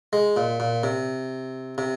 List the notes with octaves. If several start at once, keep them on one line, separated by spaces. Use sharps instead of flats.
G#3
A#2
A#2
C3
C3